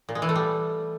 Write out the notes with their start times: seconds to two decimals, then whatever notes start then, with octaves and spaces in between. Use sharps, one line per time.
0.09 A#2
0.15 G#3
0.22 E3
0.29 A3
0.36 G3